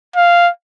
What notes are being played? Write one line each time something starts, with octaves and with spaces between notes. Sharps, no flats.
F5